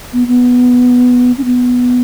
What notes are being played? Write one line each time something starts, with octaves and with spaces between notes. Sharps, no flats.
B3
B3
C#4
B3